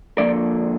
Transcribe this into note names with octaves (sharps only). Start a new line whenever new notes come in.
D3 F3 A#3 D5